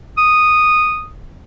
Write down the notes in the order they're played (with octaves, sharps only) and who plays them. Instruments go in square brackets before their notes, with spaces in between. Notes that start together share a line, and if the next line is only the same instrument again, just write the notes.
[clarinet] D#6